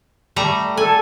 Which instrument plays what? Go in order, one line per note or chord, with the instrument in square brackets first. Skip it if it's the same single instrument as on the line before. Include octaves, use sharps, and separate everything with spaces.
[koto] G3 A3 A#5
[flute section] A4 [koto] G#5